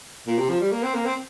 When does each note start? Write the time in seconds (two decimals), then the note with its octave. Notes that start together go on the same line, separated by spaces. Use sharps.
0.27 A#2
0.38 C3
0.49 F3
0.60 G3
0.72 A#3
0.83 C4
0.94 A#3
1.05 C4